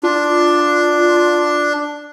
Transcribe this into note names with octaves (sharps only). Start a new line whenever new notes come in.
D4 F4